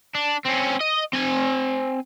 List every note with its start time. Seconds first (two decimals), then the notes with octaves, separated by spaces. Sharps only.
0.15 D4
0.46 C4 C#4
0.81 D#5
1.13 C4 G#5